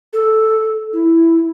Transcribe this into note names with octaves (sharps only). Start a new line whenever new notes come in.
A4
E4